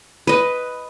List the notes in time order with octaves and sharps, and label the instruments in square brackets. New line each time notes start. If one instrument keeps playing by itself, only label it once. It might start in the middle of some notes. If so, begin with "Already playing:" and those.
[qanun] B4 D#5